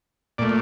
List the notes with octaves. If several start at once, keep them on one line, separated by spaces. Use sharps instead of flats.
A#2 A3 D5